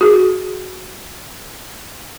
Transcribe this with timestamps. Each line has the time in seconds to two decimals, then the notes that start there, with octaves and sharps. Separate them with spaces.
0.01 F#4 G#4